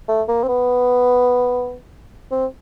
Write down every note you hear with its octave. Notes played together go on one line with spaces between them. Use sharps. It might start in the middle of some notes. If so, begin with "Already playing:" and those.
A3
A#3
C4
B3
C4